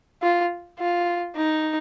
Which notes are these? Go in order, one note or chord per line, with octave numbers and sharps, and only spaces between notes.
F4
F4
D#4